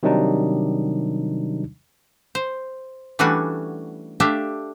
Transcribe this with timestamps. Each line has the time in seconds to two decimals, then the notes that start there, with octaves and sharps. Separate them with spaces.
0.03 C3 D#3 F#3 G3 D4 D#4
2.35 C5
3.19 E3 G3 A3 C#4 D4 F#4
4.20 A3 D4 G4 E5 F5